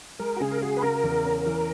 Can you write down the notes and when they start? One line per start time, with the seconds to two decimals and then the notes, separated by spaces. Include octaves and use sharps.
0.19 G#3 A#4
0.36 F#4
0.41 C#3 G#4
0.51 A#4
0.62 F#4 G#4
0.77 B4
0.83 C#3 A#4
1.04 E2
1.25 C#4
1.46 E3